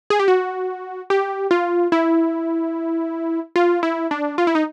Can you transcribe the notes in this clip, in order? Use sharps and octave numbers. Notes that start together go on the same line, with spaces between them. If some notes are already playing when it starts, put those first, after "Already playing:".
G#4
G4
F#4
G4
F4
E4
F4
E4
D4
F4
E4
D#4